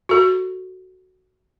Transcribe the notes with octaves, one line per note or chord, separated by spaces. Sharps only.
F#4 A4